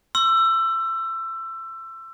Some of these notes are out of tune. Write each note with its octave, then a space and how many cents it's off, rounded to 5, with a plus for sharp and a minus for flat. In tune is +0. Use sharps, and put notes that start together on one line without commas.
C6 +35 E6 +20